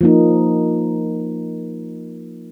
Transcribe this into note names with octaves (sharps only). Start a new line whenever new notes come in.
F3 A#3 D#4